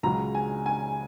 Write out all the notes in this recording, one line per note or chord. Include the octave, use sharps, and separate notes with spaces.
C#2 C#3 F#3 A#5
G#5
G#5